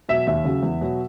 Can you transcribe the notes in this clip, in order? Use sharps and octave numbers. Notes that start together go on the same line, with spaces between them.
B2 F#3 E5
D#2 E5
C#3 F#3
E2
B2 F#3